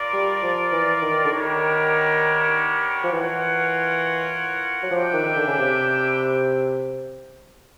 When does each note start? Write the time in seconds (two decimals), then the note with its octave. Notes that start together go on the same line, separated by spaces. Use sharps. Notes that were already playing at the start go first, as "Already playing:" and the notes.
Already playing: F4 A#4 D5
0.13 G3
0.43 F3
0.72 E3
1.02 D#3
1.25 D3
1.32 D#3 B3 D4 G4 A#4 C#5
3.04 F3
3.11 E3 F4 A#4 C#5 F#5
4.83 F#3
4.91 F3 D4 G4 B4 E5 G5
5.14 D#3
5.25 D#3
5.36 D3
5.47 C#3
5.59 C3